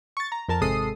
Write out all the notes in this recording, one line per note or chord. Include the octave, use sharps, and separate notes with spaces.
C#6 A6
A#5
F2 A#4 A5
G#1 C3 G#3 A4 D#6 C7